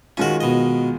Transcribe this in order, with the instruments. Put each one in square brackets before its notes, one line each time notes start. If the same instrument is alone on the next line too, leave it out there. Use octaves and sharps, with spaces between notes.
[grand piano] D#3 G#3 F4 [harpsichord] C#4 F#4
[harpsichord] B2 D#5